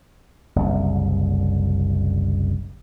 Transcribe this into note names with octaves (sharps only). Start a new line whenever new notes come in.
F#1 C2